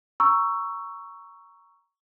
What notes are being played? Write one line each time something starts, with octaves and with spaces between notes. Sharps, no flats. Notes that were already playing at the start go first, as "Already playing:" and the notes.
A#5 C#6 E6